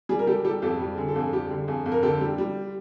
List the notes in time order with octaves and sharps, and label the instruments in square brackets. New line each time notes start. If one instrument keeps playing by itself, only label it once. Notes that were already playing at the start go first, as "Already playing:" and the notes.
[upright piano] G3 G#4
A#4
G3 G4 A4
G3 G4 A4
F2 G4 A4
G3
D3 G#4
A4
F2 G#4
G3 G4
D3
F2 G#4
F2
A#4
D3 G4 A4
G3
G3